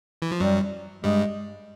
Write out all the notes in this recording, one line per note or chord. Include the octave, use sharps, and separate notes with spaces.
E3
F3
F#2 F#3 G3
G2 G3 G#3